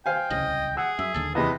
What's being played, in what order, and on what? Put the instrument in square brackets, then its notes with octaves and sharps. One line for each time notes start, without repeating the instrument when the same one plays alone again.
[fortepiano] C5 F5 G#5 [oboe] G5
[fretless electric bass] D1 C2 C#3 [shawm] D#5
[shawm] G#4 [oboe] F#5 [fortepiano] E6
[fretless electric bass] F#2 [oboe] E5
[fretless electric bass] D#1 D#2 D3 [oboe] A4
[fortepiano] E2 C3 [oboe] B4 [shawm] D#5